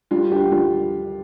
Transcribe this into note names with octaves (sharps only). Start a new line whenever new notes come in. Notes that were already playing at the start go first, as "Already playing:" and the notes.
G3 F4
D2 G4
G3 F4